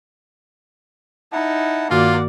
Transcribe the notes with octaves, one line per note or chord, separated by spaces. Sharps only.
D#4 E4 F#5 A5
G2 D#3 A#3 F4 F#4 D5 F#5